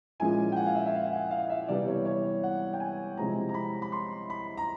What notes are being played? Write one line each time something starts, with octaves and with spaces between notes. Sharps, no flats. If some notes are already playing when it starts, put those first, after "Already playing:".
A#2 F3 G#3 C#4 E4 G#5
G5
F#5
F5
E5
E5
F5
F#5
F5
E5
C3 E3 G3 B3 D5
C#5
C#5
F#5
G5
G#5
C3 F3 G#3 C4 E4 A#5
A#5
B5
B5
C6
B5
A#5